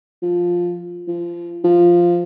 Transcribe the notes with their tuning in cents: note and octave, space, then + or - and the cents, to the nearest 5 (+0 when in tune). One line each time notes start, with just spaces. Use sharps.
F3 +10
F3 -25
F3 -5